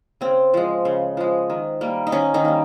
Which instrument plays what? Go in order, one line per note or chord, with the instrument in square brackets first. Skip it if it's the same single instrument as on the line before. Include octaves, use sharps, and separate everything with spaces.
[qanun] C#3 C4
F3 G#3
C#3
F3 G#3
D#3
G3 A#3
D#4
D#3 C#4
D#3 D#4
G3 A#3